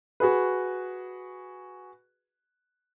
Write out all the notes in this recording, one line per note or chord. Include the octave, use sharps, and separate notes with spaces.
F#4 G#4 B4